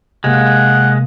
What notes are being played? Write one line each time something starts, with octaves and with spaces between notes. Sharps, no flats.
C3 G#3 A#3 F#5